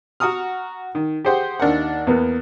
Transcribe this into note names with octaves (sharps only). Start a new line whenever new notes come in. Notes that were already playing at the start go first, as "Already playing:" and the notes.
F#4 F#5 A#5 D#6 F6
D#3
G4 G#4 C5 F#5 G5
D#2 D4 A#4 F#5
E2 A#3 B3